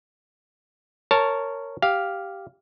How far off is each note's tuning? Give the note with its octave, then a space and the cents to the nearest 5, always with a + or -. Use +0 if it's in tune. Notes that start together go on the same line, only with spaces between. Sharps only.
A#4 -15 C#5 +0 A5 +0
G4 -5 F5 +0